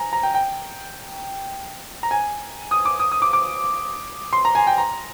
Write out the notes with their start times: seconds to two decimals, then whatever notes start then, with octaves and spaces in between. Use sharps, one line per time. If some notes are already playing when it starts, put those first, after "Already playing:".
Already playing: G#5 A#5
0.13 A#5
0.23 G5
0.34 G5
2.03 A#5
2.11 G#5
2.71 D#6
2.85 D6
3.00 D#6
3.12 D#6
3.22 D6
3.33 D6
4.33 C6
4.45 A#5
4.55 G#5
4.67 G5
4.78 A#5